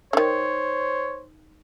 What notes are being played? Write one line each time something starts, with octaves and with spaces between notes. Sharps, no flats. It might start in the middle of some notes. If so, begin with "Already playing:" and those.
D3 D#3 C5 C#5